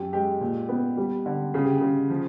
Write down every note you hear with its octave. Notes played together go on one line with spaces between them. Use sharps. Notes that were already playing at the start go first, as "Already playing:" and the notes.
Already playing: F#2 G4
G#3 G4
A#2
B3
G3
D3
C#3 G#4
G4
G#4
C#3
F3